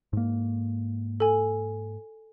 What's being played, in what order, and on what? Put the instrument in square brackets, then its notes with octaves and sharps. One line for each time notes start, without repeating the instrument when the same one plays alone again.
[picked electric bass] G#2 A#3
[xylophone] A4 G#5